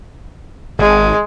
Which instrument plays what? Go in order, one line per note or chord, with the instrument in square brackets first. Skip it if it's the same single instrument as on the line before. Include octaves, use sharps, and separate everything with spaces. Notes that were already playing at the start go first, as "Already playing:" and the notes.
[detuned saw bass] G#1 [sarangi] G#3